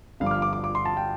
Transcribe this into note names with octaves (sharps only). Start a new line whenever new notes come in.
G1 G2 F3 F5
D6
F6
D6
D6
D6
C6
A5
G5